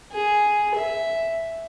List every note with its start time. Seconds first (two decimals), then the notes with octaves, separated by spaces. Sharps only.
0.12 G#4
0.75 E5